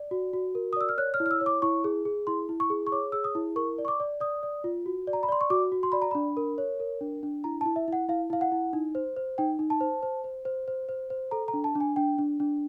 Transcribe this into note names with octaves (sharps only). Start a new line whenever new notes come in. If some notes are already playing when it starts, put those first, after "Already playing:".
Already playing: D5
F#4
F#4
A#4
D#6
D5 E6
F6
C#5 F#6
F6
E4
F6
E6
C#5
D6
E4 C#6
G#4
G#4
E4 C6
E4
C#6
G#4
C#6
C#5 D6
G#4 E6
D#6
E4
A#4 C#6
D5
C#6
D6
D5
D5 D#6
D5
F4
F#4
D5
A#5
B5
D5 C6
C#6
F#4 D6
F#4
C6
D5 B5
A#5
D4 B5
A#4
C#5
A#4
D4
D4
E4 A#5
A5
E4
E5
E4 F#5
E4 F5
E4 F5
F#5
E4
D#4
C5
C5
D#4 G5
D#4
A5
C5
C5
C5
C5
C5
C5
C5
A4 A#5
A#5
D4
A5
D4
G#5
D4 G5
D4
D4